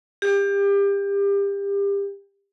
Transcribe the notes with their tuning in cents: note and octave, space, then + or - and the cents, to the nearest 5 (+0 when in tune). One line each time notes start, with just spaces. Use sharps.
G4 +30